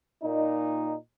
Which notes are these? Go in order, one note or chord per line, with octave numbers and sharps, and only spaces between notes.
A#2 D#4